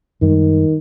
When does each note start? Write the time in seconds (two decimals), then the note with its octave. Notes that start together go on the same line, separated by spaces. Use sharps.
0.22 F#2 D#3 G3 G#3